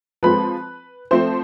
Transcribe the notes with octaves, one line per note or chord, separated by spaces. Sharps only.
F3 G#3 C4 B4 B5
F3 A3 C4 C5 C6